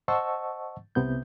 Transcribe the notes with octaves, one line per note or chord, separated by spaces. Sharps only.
C5 D#5 F#5 A5 C#6 E6
C2 C3 B3 G6